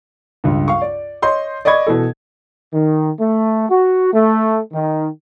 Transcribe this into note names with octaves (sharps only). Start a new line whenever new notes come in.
C#2 G2
F5 C#6
D5
C#5 D#5 C6 G6
D5 D#5 B5 C#6 G#6
B2 E3 A4
D#3
A3
F#4
A3
D#3